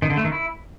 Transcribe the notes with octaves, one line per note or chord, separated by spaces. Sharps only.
D#3
D3
A3
D#3
E4